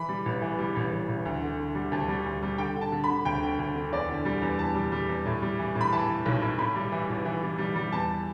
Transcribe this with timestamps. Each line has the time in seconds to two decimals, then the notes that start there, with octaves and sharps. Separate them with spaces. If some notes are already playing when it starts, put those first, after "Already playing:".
Already playing: E3 B5
0.09 G3
0.26 A1
0.42 E3
0.58 G3
0.76 A1
0.93 A1
1.09 A1
1.25 D2
1.42 D3
1.59 D3
1.75 G3
1.92 D2 A5
2.08 G3
2.26 D2
2.43 G3
2.58 D3 G5
2.76 D3
2.81 A5
2.92 D3
3.04 B5
3.09 D3
3.25 D2 G5
3.43 D3
3.59 D2
3.75 D3
3.92 E2 D5
4.08 D3
4.25 G3
4.42 E2
4.59 E2 A5
4.75 G3
4.92 G3
5.09 E2
5.26 A2
5.42 G3
5.59 E3
5.75 A2
5.81 B5
5.93 E3 A5
6.09 E3
6.26 B1
6.42 A2
6.58 A2 B5
6.76 G3
6.92 E3
7.09 A1
7.25 E3
7.42 G3
7.58 G3
7.76 G3
7.92 E2 A5